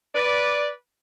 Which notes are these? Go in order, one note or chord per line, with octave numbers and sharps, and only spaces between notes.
B4 D5